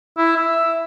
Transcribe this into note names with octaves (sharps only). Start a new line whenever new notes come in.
E4
E5